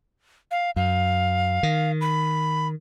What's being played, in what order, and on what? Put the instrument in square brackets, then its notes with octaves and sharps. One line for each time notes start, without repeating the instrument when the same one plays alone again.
[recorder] F5
[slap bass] F#2 [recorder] F5
[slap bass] D#3
[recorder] B5